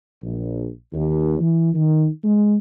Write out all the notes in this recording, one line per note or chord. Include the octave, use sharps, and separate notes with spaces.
A#1
D#2
E3
D#3
G#3